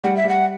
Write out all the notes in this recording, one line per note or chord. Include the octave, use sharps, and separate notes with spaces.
G3 F#5
E5
G3 F#5